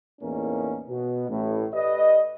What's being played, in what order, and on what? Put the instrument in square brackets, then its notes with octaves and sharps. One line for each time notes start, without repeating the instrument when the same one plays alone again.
[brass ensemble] E2 A2 A#3 C#4 D#4 A#4
B2
A1 A2
G4 B4 D5 D#5